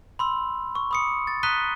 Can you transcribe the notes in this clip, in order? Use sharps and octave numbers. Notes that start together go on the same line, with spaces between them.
B5 C6 E6
C#6
B5 D#6 C#7
A6
A#5 D#6 F#6 B6 D#7 G7